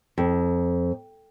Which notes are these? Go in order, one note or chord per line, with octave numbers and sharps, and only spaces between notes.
F2